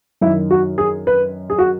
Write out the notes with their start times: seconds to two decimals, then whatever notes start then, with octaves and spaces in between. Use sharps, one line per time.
0.21 F#2 D#3 E4
0.51 F#4
0.78 G#4
1.07 B4
1.50 G#4
1.59 F#4